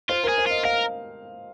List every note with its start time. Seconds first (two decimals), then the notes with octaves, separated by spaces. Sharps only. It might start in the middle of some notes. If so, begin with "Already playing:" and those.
0.09 F4 C5
0.24 G#4 A#4
0.38 C5
0.46 F4 D#5
0.65 A#4 F5